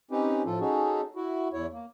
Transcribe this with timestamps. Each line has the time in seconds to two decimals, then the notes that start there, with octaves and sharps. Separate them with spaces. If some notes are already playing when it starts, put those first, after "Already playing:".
0.11 C4 C#4 D#4 G4 B4
0.46 A2 F3 F4 A4
0.60 C#4 D#4 F#4 G#4 A4
1.16 E4 F#4
1.53 E2 E4 C#5
1.73 A#3